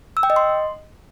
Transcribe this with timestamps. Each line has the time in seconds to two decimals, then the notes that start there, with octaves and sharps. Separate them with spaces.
0.17 E6
0.23 G5
0.30 D#5
0.36 C6